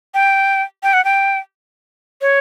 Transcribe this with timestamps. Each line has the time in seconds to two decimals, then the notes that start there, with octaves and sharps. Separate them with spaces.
0.14 G5
0.83 G5
0.93 F#5
1.05 G5
2.22 C#5